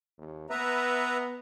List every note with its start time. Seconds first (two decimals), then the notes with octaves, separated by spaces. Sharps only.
0.18 D#2
0.50 B3 B4 E5 A#5